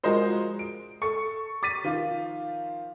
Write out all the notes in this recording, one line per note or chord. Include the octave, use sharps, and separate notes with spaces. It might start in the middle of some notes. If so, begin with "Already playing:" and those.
F3 G#3 F#4 A#4 C5 D#5
D7
A4 C#6 C#7
D6 A6 B6 D#7
D#3 F3 F4